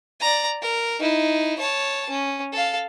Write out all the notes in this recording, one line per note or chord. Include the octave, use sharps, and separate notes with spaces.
D5 A#5
A#4
D#4 E4
C#5 A5
C#4
A4 F5